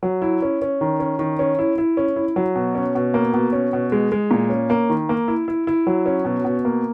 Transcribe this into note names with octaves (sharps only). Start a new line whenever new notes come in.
F#3
E4
C#4
C#4
D#3
C#4
D#3
C#4
E4
E4
C#4
E4
F#3
B2
C#4
B2
A#3
B2
C#4
B2
G#3
G#3
A#2
C#4
A#3
D#3
A#3
E4
E4
E4
F#3
C#4
B2
B2
A#3